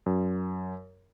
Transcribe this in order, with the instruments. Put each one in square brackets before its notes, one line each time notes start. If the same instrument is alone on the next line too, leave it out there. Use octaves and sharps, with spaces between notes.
[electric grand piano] F#2